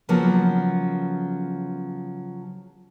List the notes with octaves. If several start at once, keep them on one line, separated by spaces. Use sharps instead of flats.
C#3 F3 F#3 A#3 B3